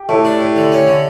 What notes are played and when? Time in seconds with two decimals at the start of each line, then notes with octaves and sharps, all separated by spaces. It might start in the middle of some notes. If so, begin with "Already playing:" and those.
Already playing: G4
0.09 A2 A3
0.25 D4
0.41 A2
0.56 D3
0.72 C#4
0.87 D3